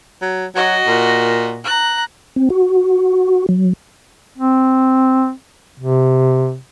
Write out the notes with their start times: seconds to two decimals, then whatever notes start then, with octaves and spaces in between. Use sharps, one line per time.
0.22 F#3
0.55 F#3 F#4 D#5
0.87 A#2
1.64 A#5 F#6
2.36 C4
2.50 F#4
3.49 F#3
4.38 C4
5.80 C3